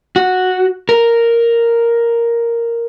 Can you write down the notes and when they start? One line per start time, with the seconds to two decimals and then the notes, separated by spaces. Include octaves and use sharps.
0.16 F#4
0.89 A#4